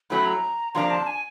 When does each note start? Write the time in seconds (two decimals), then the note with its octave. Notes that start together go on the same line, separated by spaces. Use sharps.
0.10 A2 F#3 A3 C#4 B5
0.26 A#5
0.74 C3 F3 A#3 D4 A#5
0.90 A5
1.07 G#5